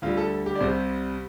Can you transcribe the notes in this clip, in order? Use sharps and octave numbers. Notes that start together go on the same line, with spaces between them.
D2 D3 G3 F4
A4
G4
D5
C2 C3 G3 C5